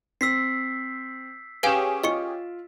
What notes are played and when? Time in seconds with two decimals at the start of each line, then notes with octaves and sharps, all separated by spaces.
0.21 C4 E6 B6 C7
1.63 C#4 G4 G#4 B4 F5 G#5 D7 E7
2.04 F4 D#5 C#6 C#7